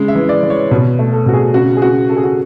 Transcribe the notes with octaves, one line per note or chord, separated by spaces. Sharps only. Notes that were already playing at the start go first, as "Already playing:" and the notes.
Already playing: C#3 G#3
E5
E3
D5
E3
C#5
B2 B4
A3
A4
B2 F#4
G#4
C#3 F#4
G#4
C#3 F#4
C#3 A4
G#4
F#4